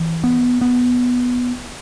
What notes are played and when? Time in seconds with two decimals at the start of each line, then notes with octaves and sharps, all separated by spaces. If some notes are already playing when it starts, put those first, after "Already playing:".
Already playing: E3
0.24 B3
0.61 B3